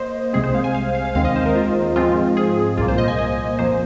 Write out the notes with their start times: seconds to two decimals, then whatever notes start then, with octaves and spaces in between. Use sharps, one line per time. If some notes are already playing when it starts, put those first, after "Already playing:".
Already playing: A#3 C5 D#5
0.33 C2 C3 G#3 C4 G#4
0.44 C5
0.54 F5
0.64 G#5
0.74 F5
0.95 F5
1.05 F5
1.15 D#2 D#3 G#3 C4 F5
1.25 D#5
1.36 C5
1.46 A#4
1.55 F4
1.96 G#2 F3 G#3 C4 F4
2.37 G#4
2.78 C2 A#2 A#3 F4
2.88 C5
2.98 D#5
3.08 G#5
3.19 D#5
3.59 F2 F3 A#3 C5